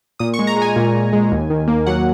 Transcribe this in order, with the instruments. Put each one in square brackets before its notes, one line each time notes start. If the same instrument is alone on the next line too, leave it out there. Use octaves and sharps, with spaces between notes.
[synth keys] A#2 D#6
C#6
G#3
A#5
G#3
G#5
A#2
A#2
G#3
D#2
D#3
A#3
F#3 F#5